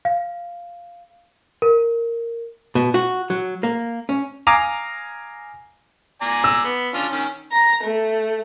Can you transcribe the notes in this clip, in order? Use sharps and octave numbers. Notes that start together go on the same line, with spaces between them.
F5
A#4
B2
F#4
F#3
A#3
C#4
F5 G#5 A#5 D6 D#6 F6
D5 G#5 A#5
E6
B3
C#4 D4 F4
D#3 C#4
A#5
A3